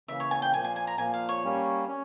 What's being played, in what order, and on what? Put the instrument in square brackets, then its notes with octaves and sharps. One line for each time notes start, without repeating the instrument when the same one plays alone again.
[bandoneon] C#3 E3 A#3 [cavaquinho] E5
[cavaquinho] C#5
G#5
G5
[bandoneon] A#2 F3 A#3 [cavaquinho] G#5
[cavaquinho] G#5
G#5
A#5
[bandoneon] A#2 F3 A#3 [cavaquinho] G#5
[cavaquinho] F5
C#5
[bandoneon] G3 A#3 C#4
C#4